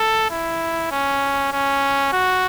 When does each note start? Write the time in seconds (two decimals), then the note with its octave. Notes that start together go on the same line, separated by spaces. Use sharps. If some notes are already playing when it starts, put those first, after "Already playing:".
Already playing: A4
0.31 E4
0.91 C#4
1.52 C#4
2.13 F#4